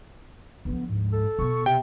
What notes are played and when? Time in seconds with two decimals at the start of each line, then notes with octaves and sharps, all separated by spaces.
0.65 D2 F3 B3
0.89 G#2
1.13 A4
1.39 B2 B3 C#6
1.66 C3 G5